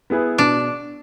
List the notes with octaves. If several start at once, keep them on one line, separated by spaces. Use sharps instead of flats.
B3 E4 G#4 B4
B2 D4